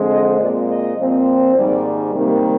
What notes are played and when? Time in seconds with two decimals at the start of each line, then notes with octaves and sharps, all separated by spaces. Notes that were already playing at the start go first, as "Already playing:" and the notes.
Already playing: F2 D3 G#3 C4
0.10 D#5
0.38 A#2 G#3 C4 D5
0.67 D#5
0.96 A#2 F3 C4
1.55 G#2 D#3 G3 A#3 D5
2.13 C3 D#3 G3 A#3